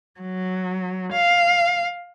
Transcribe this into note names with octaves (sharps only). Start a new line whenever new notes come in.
F#3
F5